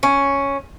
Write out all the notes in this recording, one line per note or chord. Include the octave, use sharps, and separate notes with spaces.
C#4